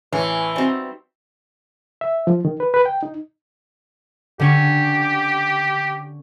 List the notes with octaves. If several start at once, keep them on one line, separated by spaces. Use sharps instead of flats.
A1 E3 C#5 G#5
G3 C4 D#4 F#4 C5
E5
F3
D#3
B4
B4
G5
D#4
D3 C#4 G4 C#6